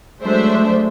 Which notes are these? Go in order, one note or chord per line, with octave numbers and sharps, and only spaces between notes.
F#3 G#3 A3 D4 C5 E5